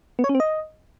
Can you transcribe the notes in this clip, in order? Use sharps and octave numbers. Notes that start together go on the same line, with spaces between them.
B3
C#5
C#4
C4
D#5